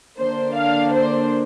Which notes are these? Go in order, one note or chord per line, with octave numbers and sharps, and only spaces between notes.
D3 A#3 D4 C5
F5
C5